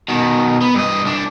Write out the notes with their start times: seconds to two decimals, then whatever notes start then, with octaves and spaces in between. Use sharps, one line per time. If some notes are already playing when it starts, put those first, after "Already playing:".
0.08 B2 D#3
0.61 B3
0.75 G2 D#5
1.04 C2 D4